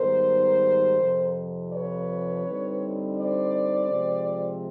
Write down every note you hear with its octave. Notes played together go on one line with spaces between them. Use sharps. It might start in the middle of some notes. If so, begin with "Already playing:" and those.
Already playing: G#2 D#3 G3 B3 A#4 C5
F2 C3 F3
B4 C#5
D3 G3 C4 D#4
C5 D5
C3 F3 G#3 C4